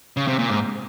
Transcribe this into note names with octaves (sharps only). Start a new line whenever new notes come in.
C#3
C3
A#2
G#2